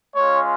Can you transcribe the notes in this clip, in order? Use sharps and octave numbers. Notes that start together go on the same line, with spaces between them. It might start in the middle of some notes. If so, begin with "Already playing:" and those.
G#3 C#4 F4 C#5